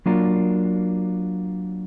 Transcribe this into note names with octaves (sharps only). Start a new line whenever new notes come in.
F#3 A#3 D4 F4 A#4